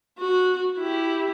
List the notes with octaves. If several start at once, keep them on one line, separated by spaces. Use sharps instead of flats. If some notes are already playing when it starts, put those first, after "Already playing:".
F#4
E4 G4